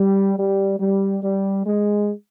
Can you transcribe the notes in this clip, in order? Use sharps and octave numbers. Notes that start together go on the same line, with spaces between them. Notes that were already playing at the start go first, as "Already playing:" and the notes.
Already playing: G3
G3
G3
G3
G#3